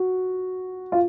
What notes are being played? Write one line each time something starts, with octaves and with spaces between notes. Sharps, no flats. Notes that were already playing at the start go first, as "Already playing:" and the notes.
Already playing: F#4
F4